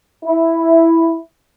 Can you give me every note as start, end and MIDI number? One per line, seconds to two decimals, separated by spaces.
0.24 1.15 64